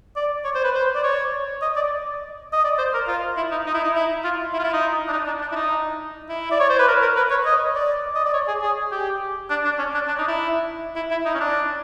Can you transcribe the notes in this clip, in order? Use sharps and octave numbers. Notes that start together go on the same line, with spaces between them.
D5
C#5
C5
B4
C5
D5
C#5
D#5
D5
D#5
D5
C5
A#4
F4
E4
D#4
D#4
E4
D#4
E4
F4
E4
F4
E4
D#4
D4
D#4
D4
D4
E4
D#4
E4
D5
C#5
C5
B4
A#4
A#4
B4
C#5
D#5
D5
D#5
D5
C#5
G#4
G#4
G4
D4
D4
C#4
D4
D4
D#4
E4
E4
E4
D#4
C#4
D4